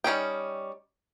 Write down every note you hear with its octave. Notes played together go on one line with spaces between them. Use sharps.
G3 C#4 D#4 G5